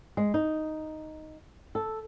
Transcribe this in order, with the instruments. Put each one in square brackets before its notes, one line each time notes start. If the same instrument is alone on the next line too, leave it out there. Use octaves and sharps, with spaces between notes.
[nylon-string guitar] G#3
D#4
A4